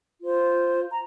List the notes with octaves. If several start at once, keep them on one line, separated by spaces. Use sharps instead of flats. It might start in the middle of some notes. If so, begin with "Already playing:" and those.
F4 C5
A#5